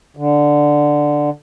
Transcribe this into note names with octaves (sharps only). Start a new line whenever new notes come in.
D3